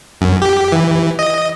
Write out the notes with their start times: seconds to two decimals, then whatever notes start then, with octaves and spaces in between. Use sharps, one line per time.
0.21 F#2
0.42 G4
0.72 E3
1.19 D#5